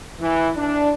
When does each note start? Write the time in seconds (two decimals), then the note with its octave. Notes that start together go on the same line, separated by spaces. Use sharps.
0.21 E3
0.56 D4